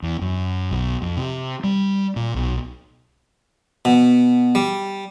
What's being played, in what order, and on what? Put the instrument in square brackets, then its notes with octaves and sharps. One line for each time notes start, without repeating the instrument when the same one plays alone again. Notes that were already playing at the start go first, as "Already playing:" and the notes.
[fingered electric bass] E2
F#2
B1
F2
C3
G3
A#2
B1
[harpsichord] B2
G3